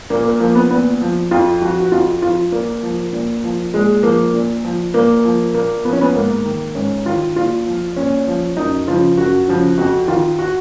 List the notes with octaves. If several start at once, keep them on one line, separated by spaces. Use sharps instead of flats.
A#2 A#3
A#3
F3 A#3
B3
A#2 B3
F3
F2 F4
F3 F#4
F#4
F2 F4
F3 F4
A#2 A#3
F3
A#2
F3
A#2 G#3
F3 A#3
A#2
F3
A#2 A#3
F3
A#2 A#3
F3 B3
C#4
B3
G#2 A#3
D#3
G#2 C#4
D#3 F4
A#2 F4
F3
A#2 C#4
F3
F#2 D#4
C#3 F3 F4
F#2 F#4
C#3 F3
F2 F#4
D#3 F4
F#4